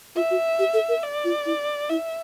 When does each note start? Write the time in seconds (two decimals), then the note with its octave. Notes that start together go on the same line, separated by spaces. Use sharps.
0.16 F4 E5
0.31 F#4
0.59 G4
0.73 A4
0.89 A#4
1.03 D5
1.24 F4
1.46 E4
1.89 E4 E5